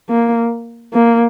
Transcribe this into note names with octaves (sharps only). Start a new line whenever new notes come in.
A#3
A#3